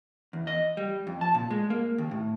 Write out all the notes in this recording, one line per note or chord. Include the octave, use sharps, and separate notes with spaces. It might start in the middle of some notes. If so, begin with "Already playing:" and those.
E2
D#5
G3
F2
A5
A#2
G#3
A#3
D#2
A2